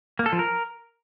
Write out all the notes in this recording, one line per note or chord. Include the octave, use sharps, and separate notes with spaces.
A#3
A4
F3
A#4